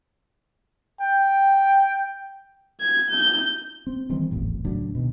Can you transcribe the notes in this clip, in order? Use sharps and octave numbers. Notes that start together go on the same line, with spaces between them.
G5
G#6
G6
C4
D#3 E3 G3 C4
D1 G#1 E2 A2
C#2 A2 D3 F#3
B2 D#3